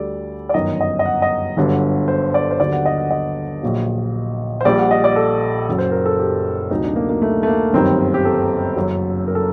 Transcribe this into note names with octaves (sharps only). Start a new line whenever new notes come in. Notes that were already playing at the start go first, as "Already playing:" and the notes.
Already playing: D2 D3 G3 A4 D5
D5
G1 F#2 D#3 D#5
D#5
D#5
F#5
D#5
G1 G2 D3 F#3
C5
D5
C5
D#2 D3 F#3 D5
F#5
D#5
F#5
D#5
A#1 A#2 F#3
C5
A#1 A#2 G3 D5
F#5
D#5
D5
A4
F#1 F#2 F#3
C5
A#4
A4
G4
D2 C3 F#3 D#4
D4
A#3
A#3
A3
A3
A#3
G1 F#2 D#3 G3 C4
G4
A4
F#1 F#2 F#3
A#4
A4